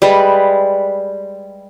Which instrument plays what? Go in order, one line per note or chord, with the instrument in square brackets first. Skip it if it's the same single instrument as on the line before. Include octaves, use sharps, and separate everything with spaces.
[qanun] G3 G#3 B4